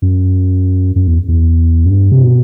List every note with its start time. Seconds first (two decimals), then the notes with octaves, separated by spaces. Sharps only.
0.02 F#2
0.96 F#2
1.07 E2
1.28 E2
1.86 F#2
1.91 G2
2.12 C3
2.23 B2